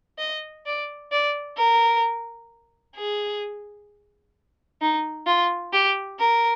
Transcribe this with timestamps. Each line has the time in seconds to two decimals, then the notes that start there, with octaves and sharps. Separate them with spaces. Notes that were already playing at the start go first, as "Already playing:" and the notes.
0.18 D#5
0.66 D5
1.12 D5
1.57 A#4
2.96 G#4
4.81 D#4
5.26 F4
5.73 G4
6.19 A#4